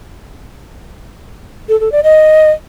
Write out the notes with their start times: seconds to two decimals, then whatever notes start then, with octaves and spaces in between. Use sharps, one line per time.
1.69 A4
1.80 A4
1.92 D5
2.04 D#5